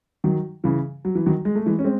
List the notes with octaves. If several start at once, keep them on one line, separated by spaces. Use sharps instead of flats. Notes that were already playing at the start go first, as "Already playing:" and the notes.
D#3 F#3
C#3 E3
F#3
E3
D#3 F#3
G#3
A3
E3 G#3
C#4
G#3 C4